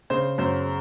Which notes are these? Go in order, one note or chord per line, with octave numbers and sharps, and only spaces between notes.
C#3 C5
F#2 C5